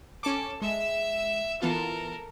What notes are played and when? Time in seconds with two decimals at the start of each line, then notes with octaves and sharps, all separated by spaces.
0.23 C#4 A4 D6
0.62 G#3 E5 E6
1.62 E3 B3 F4 A4 A#4